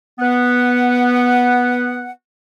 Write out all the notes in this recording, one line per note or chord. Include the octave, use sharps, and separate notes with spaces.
B3 F#5